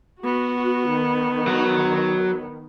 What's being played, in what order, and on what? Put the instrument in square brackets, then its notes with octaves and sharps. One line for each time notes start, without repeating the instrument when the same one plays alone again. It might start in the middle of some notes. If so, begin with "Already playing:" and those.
[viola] B3 [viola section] F#4
[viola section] D#3
[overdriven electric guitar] F#3